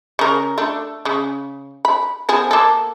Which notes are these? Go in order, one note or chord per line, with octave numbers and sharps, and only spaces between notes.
C#3 A#4
A3 D4
C#3
B5
F3 B3 G#4
A#3 A4